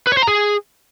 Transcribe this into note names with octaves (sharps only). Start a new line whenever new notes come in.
B4
C#5
C5
A#5
G#4